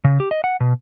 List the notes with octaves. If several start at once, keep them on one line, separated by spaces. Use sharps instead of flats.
C#3
G4
D#5
F#5
B2